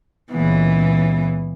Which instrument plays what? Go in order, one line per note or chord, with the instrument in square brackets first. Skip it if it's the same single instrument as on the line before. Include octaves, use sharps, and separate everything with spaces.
[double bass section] C#2 A#2 B3 [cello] E3